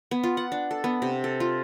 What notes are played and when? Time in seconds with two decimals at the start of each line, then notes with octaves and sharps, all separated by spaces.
0.11 B3
0.24 F4
0.37 F#5
0.52 D4
0.71 A4
0.84 B3
1.02 C3
1.24 A4
1.40 F4